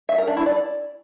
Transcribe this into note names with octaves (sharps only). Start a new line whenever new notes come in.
E5
A#4
D4
E4
D5